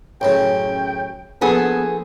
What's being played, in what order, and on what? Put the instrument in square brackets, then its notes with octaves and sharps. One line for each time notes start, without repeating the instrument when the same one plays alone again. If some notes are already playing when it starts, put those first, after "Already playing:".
[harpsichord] A1 F#2 C#3 [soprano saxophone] G5
[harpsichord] A#1 [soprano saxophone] B3 [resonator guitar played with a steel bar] G#4 A4